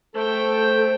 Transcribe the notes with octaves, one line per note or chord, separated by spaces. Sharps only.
A3 A4 C5 G5